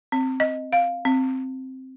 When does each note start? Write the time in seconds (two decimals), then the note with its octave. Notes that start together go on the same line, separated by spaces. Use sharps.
0.12 C4
0.40 D#5
0.73 F5
1.05 C4